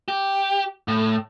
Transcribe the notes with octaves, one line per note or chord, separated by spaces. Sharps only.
G4
A2